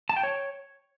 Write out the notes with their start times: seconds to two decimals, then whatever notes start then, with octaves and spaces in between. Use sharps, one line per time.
0.09 A5
0.16 G5
0.23 C#5